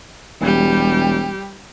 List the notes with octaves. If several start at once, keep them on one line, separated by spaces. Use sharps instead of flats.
E1 G3 G4